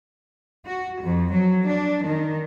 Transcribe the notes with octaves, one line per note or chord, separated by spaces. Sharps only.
F#4
F2
F#3
D4
D#3